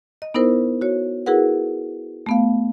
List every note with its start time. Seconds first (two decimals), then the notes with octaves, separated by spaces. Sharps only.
0.22 D#5
0.34 B3 D#4 E4 A#4 C5
0.81 F#4 C#5
1.26 E4 F#4 G#4 A#4 B4 F#5
2.26 A3 B3 F5